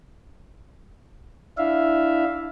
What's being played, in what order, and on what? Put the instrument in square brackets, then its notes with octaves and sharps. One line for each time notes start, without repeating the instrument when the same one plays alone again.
[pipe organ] D4 E4 E5 F5